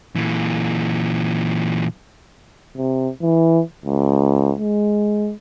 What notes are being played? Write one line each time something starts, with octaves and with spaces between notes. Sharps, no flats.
A#2 E3
C3
E3
C#2
G#3